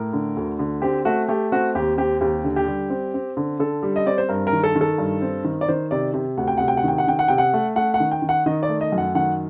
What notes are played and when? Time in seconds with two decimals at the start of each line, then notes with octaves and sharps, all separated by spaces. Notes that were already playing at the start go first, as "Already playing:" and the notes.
Already playing: A2 A#4
0.13 D3
0.37 D2
0.59 D3
0.82 C4 G4
1.05 A3 F#4
1.28 A3 G4
1.52 C4 F#4
1.75 D#2 G4
1.98 C4 G4
2.21 D#2 G4
2.44 D3
2.56 G4
2.67 G3
2.90 C4
3.14 C4
3.37 D3
3.60 D3 A4
3.83 G3
3.96 D#5
4.06 C4 D5
4.18 C5
4.29 G2 A#4
4.47 A#4
4.53 D#3
4.63 A4
4.75 D#3
4.81 A4
4.98 G2
5.22 C4
5.44 D#3
5.61 D5
5.69 D#3 C5
5.91 C3 D5
6.14 C3
6.37 D2 F#5
6.48 G5
6.57 C3 F#5
6.68 G5
6.77 F#5
6.84 D#3 G5
6.98 F#5
7.07 D#3 G5
7.19 F#5
7.28 C3 G5
7.38 F#5
7.53 A3
7.76 A3 F#5
7.94 F#5
8.00 D#3
8.11 G5
8.22 D#3
8.29 F#5
8.46 D#3 D#5
8.63 D5
8.69 A3
8.81 D#5
8.92 F#2
8.98 F#5
9.15 D#3 F#5